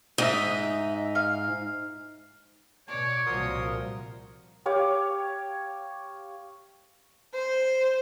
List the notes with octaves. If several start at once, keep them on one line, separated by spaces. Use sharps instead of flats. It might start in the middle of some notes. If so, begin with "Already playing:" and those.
G#2 D#4 D#5 E5
F5
B2 C#5 D5
C2 A#2 F3 F#4 A#4 C6 D#6
G4 C#5 F5 D6
C5